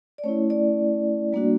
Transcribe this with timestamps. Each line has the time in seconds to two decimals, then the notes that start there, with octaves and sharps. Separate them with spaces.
0.18 D5
0.24 A3 C#4 E4 C#5
0.50 D5
1.33 G3 A#3 D4 F#4